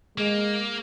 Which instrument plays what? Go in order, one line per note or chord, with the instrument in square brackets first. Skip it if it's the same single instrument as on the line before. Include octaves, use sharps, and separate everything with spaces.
[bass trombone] G#3 [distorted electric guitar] A#3